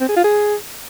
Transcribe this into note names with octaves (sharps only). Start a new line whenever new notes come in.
C4
G#4
F4
G#4